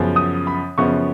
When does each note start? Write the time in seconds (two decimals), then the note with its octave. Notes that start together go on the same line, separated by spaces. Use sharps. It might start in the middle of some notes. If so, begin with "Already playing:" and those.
Already playing: F#2 C#3 F3 B3
0.16 D#6
0.47 B5
0.78 F#2 C#3 F3 B3 C#6